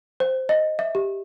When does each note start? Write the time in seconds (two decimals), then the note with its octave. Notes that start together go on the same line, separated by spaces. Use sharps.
0.20 C5
0.49 D#5
0.79 E5
0.95 G4